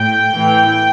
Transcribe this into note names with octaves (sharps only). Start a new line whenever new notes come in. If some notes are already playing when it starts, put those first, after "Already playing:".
Already playing: A2 G5
A2 E3